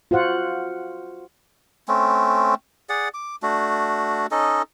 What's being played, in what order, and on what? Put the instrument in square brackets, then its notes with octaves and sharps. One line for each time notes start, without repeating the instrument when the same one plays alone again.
[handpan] F4 F#4 C5 F#5
[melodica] A3 C4 C#4
G#4 D5 F#5
D6
A3 D4 F#4
C#4 D#4 A4 D#5